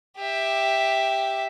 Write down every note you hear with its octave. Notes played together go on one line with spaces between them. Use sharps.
G4 E5